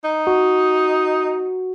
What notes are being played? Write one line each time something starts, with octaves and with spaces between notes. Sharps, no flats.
D#4
F#4